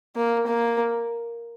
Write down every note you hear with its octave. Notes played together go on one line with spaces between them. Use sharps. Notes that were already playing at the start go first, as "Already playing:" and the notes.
A#3
A#3